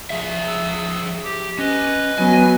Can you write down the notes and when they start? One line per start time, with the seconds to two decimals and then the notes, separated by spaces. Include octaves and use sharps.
0.10 F3 G#4 E5
0.47 E6
1.24 G4
1.59 C#4 B4 D#5
2.18 F#3 B3 G#5